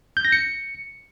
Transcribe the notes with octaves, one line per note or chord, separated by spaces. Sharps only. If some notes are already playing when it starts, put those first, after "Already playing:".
G6
A#6
C#7